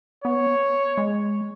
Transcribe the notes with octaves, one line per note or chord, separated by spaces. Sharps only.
B3 C#5
G#3